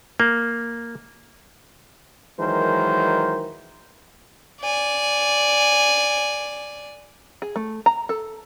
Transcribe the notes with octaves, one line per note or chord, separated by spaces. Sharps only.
A#3
D#3 E3 F#3 G#3 A#4 C5
D5 G#5
G#4
A3
A#5
A4